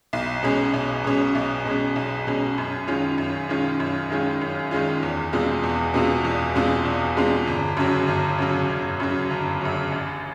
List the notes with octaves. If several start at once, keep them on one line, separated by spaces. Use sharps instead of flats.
B1
B2 G#3 C#4
B1
B2 G#3 C#4
B1
B2 G#3 C#4
B1
B2 G#3 C#4
F#2
D#3 G#3 C#4 F4
F#2
D#3 G#3 C#4 F4
F#2
D#3 G#3 C#4 F4
F#2
D#3 G#3 C#4 F4
E2
B2 G#3 C4 F4
E2
B2 G#3 C4 F4
E2
B2 G#3 C4 F4
E2
B2 G#3 C4 F4
G1
F#2 C#3 F#3
G1
F#2 C#3 F#3
G1
F#2 C#3 F#3
G1
F#2 C#3 F#3
A1